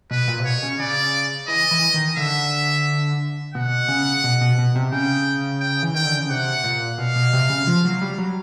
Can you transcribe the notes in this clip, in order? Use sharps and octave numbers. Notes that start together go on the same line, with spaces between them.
B2 B4
A#2
C3
B2 C#5
C#3
C#3 D5
E3 D#5
E3
D#3
D3 E5
B2 F#5
C#3
B2
B2
B2
C3
C#3 G5
G5
E3
D#3 G5
D3
C#3
C3 F#5
A#2
B2 F5
B2
C3
C#3
F3
F#3
G3
F#3